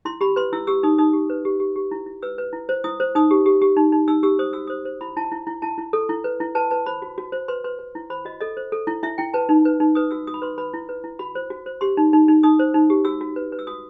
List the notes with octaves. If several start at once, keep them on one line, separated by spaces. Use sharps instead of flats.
E4 C6
G4 B5
B4 C6
E4 E6
G4 E6
D#4 D#6
D#4 D#6
G4
B4
G4
G4
G4
E4
E4
B4 E6
B4
E4
C5
E4 D#6
C5
D#4 D#6
G4
G4
G4
D#4
D#4
D#4 E6
G4 E6
C5 D#6
F#4 E6
C5 D#6
C5
E4 B5
E4 A5
E4
E4
E4 A5
E4
A4
E4
B4
E4
B4 A5
B4 A5
C5 B5
F#4
F#4
C5
B4 C6
B4 C6
B4
E4
C5 B5
F#4 D#5
A4 D#5
C5
A4
E4
E4 E5
E4 G5
B4 A5
D#4
B4
D#4
B4 D#6
F#4 E6
F#4 D#6
B5
B4 C6
B4 B5
E4
B4
E4
F#4 B5
C5
F#4
C5
G4 C6
D#4
D#4
D#4
D#4 D#6
C5
D#4
G4
F#4 E6
F#4
B4
B4
E6
F#4 D#6